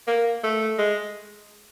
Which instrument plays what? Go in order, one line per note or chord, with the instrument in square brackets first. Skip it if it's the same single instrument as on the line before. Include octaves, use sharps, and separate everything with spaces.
[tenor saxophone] A#3
A3
G#3